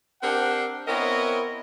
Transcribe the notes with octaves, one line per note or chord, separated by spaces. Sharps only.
C4 D4 G4 A#4 F#5
B3 C4 E4 A#4 C#5 D#5